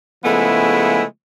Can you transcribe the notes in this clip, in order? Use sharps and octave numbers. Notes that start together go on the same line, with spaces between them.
C#3 F3 G#3 A3 B3 E4